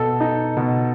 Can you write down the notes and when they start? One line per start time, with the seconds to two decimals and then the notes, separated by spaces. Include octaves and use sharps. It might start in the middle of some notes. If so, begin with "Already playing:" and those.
Already playing: B2 A4
0.20 D#4
0.57 B2